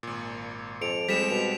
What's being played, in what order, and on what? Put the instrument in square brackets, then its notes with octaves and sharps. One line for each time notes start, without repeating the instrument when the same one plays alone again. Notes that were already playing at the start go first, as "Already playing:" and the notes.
[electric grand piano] G#1 A#2
[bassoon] F2 [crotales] C#7 D7 F7
[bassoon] F2 [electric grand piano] G3 G#3 C4 [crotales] B6 D7 E7
[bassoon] B2 [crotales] F7